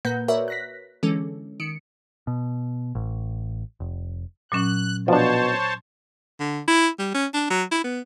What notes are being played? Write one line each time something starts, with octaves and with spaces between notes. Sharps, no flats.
A#2 A#3 B4 F#5 G6
F#4 A#4 B4 C#5 D5 E5
F#6 A#6 B6
D3 E3 G#3 C#4 A4
D#3 C#7 D7
B2
A1
F1
A#2 F#3 C#4 F#6
B2 F3 D4 C5 C#5 A5
D3
E4
G3
C#4
D4
F#3
E4
B3